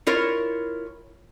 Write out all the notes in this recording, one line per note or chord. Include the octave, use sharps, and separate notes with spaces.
E4 F4 A#4 C#5